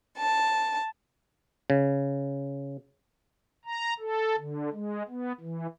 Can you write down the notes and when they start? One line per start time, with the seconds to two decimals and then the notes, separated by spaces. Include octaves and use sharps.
0.18 A5
1.70 C#3
3.65 A#5
4.00 A4
4.38 D3
4.72 G#3
5.09 B3
5.40 E3